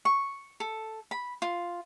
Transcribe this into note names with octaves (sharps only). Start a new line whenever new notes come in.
C#6
A4
B5
F4